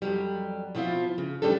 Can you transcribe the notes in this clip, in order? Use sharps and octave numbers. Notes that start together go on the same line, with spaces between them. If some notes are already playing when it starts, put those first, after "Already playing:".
F2 F#3 G3
B2 F3 C4 E4 F4
C#3
A2 G3 C#4 D4 G4 A4